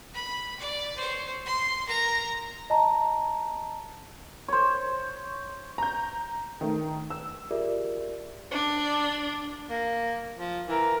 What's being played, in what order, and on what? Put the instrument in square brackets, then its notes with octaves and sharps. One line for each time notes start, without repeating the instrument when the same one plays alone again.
[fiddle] B5
D5
C5 C#5
C6
A#4 A#5
[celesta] D#5 A5 A#5
[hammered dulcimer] C5 C#5
[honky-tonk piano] A#5 G6
D#3 A3
E6
[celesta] F4 G4 G#4 A#4 D5 E5
[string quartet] D4
[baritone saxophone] A#3
F3
[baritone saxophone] E3 [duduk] A#4